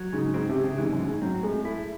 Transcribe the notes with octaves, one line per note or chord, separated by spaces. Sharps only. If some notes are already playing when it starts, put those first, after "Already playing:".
Already playing: F#3
G#2 C#3
G#2 C4
C3
C#3
C3
G#2 E3
F#2
A2
G#2
F#3 C4
A2 G#3
A3 E4